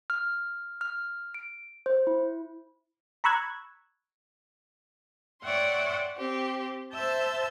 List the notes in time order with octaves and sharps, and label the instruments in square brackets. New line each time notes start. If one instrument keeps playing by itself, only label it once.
[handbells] F6
F6
D7
C5
E4
[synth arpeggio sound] A#5 B5 C#6 E6 F#6 G#6
[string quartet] C#5 D5 E5 F#5 G5 C6
C4 G4
C5 E5 A5 E6 G6